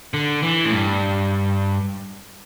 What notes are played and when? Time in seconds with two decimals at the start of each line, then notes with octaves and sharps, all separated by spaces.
0.14 D3
0.43 E3
0.65 A2
0.73 G2